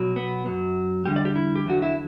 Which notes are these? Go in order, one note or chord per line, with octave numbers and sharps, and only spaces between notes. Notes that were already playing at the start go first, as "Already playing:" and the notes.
Already playing: B2 F#3
B3
F#2 F#3
E2 D3 G3 G4
D5
G4
E4
G4
E2 D3 F#3 F#4
E4